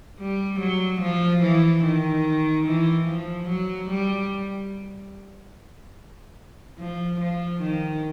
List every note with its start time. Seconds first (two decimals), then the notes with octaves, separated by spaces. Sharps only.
0.20 G3
0.60 F#3
1.01 F3
1.43 E3
1.84 D#3
2.67 E3
3.08 F3
3.50 F#3
3.90 G3
6.79 F3
7.20 F3
7.61 D#3